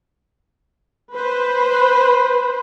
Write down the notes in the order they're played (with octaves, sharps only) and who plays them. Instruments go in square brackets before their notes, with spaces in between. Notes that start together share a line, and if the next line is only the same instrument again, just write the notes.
[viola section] B4 C5